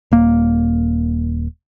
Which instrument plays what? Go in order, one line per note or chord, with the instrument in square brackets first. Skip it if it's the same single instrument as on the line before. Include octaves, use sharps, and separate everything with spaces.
[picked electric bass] D#1 A#3